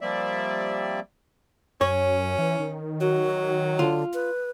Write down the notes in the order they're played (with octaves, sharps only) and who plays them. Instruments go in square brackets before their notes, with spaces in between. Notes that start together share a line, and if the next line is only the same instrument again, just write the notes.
[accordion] F3 G3 A#3 C4 D5 E5
[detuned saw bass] F#2 [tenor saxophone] C#4 [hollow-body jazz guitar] C#5
[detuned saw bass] E3
D#3
[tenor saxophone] F#3 [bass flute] F#4
[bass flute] D3 [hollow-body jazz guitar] F4
[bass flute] B4